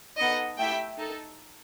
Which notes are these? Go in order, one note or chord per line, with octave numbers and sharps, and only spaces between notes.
B3 D#4 A4 D#5 F#5
A3 E4 G4 E5 G5
D#4 A4